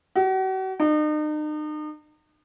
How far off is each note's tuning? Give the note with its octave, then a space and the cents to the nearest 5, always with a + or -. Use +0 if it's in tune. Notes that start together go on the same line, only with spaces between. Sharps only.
F#4 +40
D#4 -40